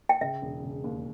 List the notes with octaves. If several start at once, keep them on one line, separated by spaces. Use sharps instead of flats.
G5
C#3 E5
E1
C#3
D#2